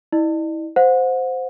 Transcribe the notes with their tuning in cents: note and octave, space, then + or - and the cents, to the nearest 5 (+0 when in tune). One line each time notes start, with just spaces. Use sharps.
E4 -30 D5 +45
C5 -10 F#5 -35